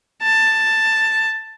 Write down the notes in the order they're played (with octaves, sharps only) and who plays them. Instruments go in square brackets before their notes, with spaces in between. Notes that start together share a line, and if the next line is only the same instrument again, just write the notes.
[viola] A5